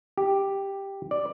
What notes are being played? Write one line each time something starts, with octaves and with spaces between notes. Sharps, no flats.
G4
D5